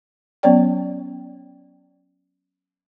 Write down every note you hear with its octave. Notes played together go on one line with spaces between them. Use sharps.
F#3 B3 C#4 C#5 D5 G5